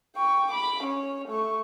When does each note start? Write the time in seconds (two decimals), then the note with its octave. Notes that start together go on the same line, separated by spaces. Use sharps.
0.16 G5 C#6
0.51 B5 D6
0.84 C#4 C#5
1.28 A3 C#6